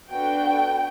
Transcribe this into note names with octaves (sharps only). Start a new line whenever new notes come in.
B3 D4 F#4 A4 G5